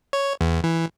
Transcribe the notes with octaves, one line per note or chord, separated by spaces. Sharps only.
C#5
E2
E3